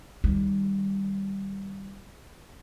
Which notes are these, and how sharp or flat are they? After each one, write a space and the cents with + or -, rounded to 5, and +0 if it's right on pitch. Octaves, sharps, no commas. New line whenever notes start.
D#3 +0 G3 +0